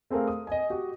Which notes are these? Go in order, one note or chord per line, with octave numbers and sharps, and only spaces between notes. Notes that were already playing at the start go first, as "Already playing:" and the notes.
A3 C4 G#4 A#4 F5
D#6
D#5 G#5
F#4 G4